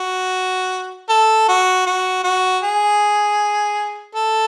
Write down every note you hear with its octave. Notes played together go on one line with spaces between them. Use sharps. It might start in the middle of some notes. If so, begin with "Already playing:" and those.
Already playing: F#4
A4
F#4
F#4
F#4
G#4
A4